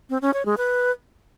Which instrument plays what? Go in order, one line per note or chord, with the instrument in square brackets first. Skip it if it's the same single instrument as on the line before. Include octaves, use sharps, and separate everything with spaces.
[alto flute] C4
C#4
C#5
G#3
B4